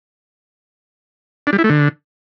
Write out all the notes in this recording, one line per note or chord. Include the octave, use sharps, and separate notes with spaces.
D4
G3
E4
A3
D3